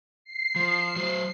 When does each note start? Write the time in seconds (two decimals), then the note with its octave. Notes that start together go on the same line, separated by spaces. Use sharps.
0.24 C7
0.56 F3
0.96 F#3 F#4 C5